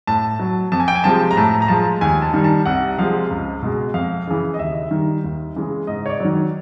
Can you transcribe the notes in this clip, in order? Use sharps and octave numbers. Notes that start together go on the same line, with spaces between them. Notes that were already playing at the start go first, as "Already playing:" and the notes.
A2 A5
F#3
F2 A5
G#5
G5
G#5
C3 F3 G#3 A5
A#5
A2 A5
A#5
F3 G#3 A5
D#2 G#5
A5
D#3 G3
A5
C2 F#5
C3 F3 G#3 F5
C#2
B2 G#3
F2 F5
C#3 E3
D#5
D#2 E5
D#3 G3
D#2
C#3 E3 G#3
G#2 D#5
C#5
D5
D#3 F#3